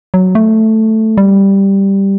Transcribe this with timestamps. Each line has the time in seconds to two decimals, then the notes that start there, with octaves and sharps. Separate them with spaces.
0.14 F#3
0.35 A3
1.17 G3